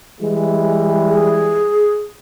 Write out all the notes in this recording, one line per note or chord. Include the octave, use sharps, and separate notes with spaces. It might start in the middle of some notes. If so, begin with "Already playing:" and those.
E3 G3 G#3
G#4